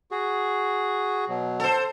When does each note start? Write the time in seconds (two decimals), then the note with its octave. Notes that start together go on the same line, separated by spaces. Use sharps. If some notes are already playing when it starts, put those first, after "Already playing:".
0.11 F#4 G#4
1.29 B2 F#3
1.60 A4 C5